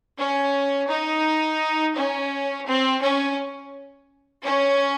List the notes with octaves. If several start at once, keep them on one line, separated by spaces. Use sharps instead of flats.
C#4
D#4
C#4
C4
C#4
C#4